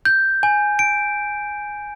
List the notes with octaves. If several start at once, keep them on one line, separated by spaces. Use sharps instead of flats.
G6
G#5
D7